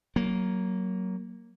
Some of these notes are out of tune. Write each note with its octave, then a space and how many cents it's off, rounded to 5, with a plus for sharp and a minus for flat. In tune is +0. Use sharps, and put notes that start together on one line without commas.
F#3 +15 A#3 +0